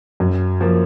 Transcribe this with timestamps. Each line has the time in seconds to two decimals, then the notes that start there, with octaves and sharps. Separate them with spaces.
0.20 F#2
0.61 F3 A#3